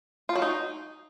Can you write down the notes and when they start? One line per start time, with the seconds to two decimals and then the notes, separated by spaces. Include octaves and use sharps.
0.29 F4
0.36 F#3
0.42 D#4